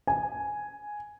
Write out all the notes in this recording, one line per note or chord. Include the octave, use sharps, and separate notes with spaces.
G#5